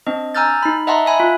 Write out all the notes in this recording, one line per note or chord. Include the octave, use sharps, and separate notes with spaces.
C4 D4 D#5
G#5 A#5 E6 F6 G6 A6
D#4 B5
D#5 E5 F#5 A5 A#5 C6
E5 G#5 B5
F4